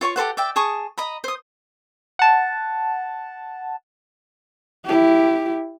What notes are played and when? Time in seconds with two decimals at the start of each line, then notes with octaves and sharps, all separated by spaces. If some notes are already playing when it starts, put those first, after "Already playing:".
0.01 F4 C#5 A5 C#6
0.16 G4 A4 C5 F#5
0.37 D5 E5 G5
0.56 G#4 A5 C#6 D#6
0.98 D#5 A#5 B5
1.24 C5 D#6
2.19 F#5 A5
4.85 E4 G4